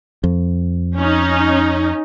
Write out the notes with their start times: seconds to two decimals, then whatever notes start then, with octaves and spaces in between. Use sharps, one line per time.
0.24 F2
0.96 C#4 D#4